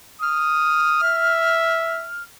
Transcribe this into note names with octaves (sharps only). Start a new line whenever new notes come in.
D#6 F6
E5